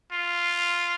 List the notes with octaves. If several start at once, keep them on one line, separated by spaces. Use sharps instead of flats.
F4